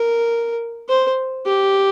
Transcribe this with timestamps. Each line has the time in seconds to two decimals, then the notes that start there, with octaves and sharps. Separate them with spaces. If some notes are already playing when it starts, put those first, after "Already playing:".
Already playing: A#4
0.89 C5
1.46 G4